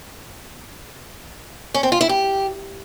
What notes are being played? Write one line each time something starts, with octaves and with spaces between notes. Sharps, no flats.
C#4
C4
F4
E4
G4